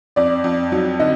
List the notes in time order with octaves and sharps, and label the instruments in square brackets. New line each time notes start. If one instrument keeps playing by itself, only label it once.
[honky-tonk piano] F2 [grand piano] D5
[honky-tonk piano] F2
F#3
[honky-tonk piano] D3 [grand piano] D#5